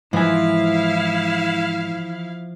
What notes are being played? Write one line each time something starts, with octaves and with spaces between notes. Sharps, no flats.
G#2 E3 F3 E4 E5 F5 G#5